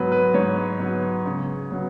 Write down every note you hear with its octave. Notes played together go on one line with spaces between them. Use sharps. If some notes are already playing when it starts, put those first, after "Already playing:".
Already playing: G#2 F#3 B3 B4
B4
G#2 C#5
F#3 B3
C#3
F#3 B3